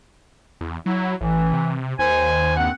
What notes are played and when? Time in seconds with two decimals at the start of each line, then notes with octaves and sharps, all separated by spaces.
0.61 E2
0.86 F#3 E4
1.21 A1 E3
1.53 C3
1.99 D#2 C5 G#5
2.57 G2 C4 F#5